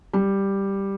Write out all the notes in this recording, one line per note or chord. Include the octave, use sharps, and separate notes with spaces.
G3